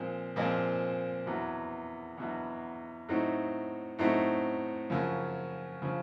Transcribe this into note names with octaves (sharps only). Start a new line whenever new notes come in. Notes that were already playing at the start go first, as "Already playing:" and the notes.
Already playing: A#2 F3 G#3 C4
A#2 F3 G#3 C4
E2 B2 F#3
E2 B2 F#3
A2 F#3 A3 C4 D#4
A2 F#3 A3 C4 D#4
F#2 C#3 F3
C#3 F3